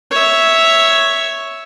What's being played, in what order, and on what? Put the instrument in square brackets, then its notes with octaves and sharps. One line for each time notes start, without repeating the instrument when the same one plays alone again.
[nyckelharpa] C#5 E5